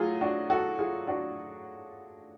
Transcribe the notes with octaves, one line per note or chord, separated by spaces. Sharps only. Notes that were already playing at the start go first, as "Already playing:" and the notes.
Already playing: F#3 A3 F4 G#4
D4 F#4
F#4 A4
F4 G#4
D4 F#4